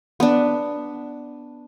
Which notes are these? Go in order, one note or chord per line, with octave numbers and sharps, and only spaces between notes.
B3 D4